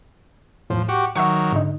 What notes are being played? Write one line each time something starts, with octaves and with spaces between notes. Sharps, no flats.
E2 A2 F3
F#4 G4
D#3 F#3 E5 F#5 C#6
G#2 D3 D#4